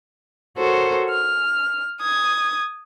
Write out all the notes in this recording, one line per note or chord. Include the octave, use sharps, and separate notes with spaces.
F#4 A4 A#4 C5 C#5
F6
D#6 G#6